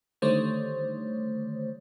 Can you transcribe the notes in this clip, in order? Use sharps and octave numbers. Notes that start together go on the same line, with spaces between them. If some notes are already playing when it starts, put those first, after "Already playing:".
D3 D#3 G3 A3 C5 C#5